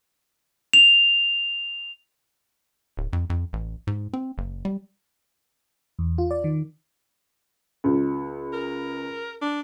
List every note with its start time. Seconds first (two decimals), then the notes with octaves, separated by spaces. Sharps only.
0.73 F7
2.97 D1
3.13 F2
3.30 F2
3.53 A1
3.87 G#2
4.13 C4
4.38 F#1
4.65 G3
5.99 E2
6.18 F4
6.31 D5
6.44 D#3
7.84 C#2
8.53 A#4
9.42 D4